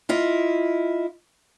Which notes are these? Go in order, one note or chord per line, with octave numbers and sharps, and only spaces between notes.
E4 F4 D#5